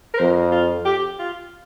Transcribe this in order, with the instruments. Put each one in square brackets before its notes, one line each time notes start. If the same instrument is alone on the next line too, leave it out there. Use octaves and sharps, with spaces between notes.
[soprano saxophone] A#4
[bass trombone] F2 [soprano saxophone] C5
[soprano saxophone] F4
G4
F4